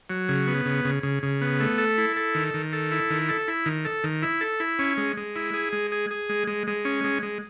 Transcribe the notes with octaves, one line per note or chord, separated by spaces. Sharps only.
F#3
C#3
B3
C#3
C#3
C#3
C#3
B3
A3
A4
E4
A4
D#3
D#3
A4
E4
D#3
A4
E4
D#3
A4
D#3
E4
A4
E4
C#4
G#3
G#3
E4
G#4
G#3
G#4
G#4
G#3
G#3
G#3
C#4
G#3
G#3